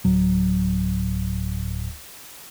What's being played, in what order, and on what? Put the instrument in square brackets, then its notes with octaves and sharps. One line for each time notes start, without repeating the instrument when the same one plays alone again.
[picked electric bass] D1 F#3